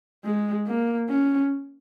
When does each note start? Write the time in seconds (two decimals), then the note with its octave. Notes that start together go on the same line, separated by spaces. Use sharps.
0.24 G#3
0.67 A#3
1.09 C#4